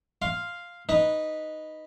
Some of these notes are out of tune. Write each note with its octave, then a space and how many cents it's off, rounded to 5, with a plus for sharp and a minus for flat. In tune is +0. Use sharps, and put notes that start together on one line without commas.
F5 +0 C6 +0
D#4 +0 B4 -5